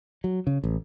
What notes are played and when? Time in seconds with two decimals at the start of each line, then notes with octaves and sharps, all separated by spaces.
0.24 F#3
0.47 C#3
0.64 A1